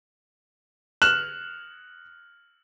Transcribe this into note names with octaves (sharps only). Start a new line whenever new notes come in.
F6 F#6 E7 F#7